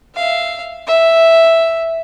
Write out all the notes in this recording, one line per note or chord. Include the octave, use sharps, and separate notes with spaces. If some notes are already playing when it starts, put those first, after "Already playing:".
E5 F5
E5